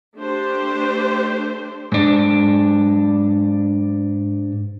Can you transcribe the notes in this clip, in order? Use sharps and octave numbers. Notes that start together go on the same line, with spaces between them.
A3 D4 G4 C5
G#2 D4